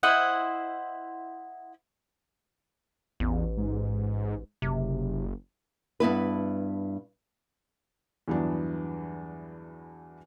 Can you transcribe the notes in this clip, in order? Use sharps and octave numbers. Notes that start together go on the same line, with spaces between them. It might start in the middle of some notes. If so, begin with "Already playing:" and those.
E4 C5 D#5 F#5
A1 E2
G#2
F#1 C3
G2 B3 E4 B4
E2 G2 E3 F#3 B3 D4